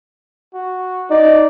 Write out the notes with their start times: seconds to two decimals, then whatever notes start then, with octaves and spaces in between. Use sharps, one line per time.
0.54 F#4
1.10 D#4 D5